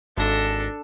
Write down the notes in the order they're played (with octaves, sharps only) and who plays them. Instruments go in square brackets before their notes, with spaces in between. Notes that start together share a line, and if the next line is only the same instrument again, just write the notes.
[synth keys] G#1 A#6 [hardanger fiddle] D4 A4